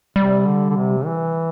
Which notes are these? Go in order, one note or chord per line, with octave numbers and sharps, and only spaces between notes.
C3 G3
D3
D3
C3
E3